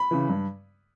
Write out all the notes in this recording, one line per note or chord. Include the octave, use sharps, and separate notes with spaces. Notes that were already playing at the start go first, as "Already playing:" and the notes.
Already playing: B5
C#3 E3
G2